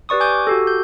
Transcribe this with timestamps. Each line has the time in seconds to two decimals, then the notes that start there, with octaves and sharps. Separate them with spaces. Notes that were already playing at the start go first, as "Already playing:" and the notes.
0.09 G4 B4 D5 C#6 D#6
0.20 G#5 D6 G6 G#6
0.47 F#4 G4 A4
0.67 G6